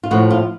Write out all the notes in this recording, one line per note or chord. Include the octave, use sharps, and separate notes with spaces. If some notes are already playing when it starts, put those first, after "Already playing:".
F4
A2 F3 F#4
F4